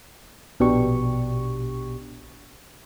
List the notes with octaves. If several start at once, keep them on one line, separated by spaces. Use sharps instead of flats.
A#1 B2 D4 G4 C#6